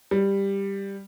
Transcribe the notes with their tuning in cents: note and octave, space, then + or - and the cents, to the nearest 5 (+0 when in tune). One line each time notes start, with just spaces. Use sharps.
G3 +10